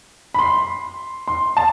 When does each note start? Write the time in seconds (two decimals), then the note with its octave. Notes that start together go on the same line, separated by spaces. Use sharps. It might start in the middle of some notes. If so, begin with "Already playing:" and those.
0.34 B5
0.39 C6
1.28 C6
1.57 A5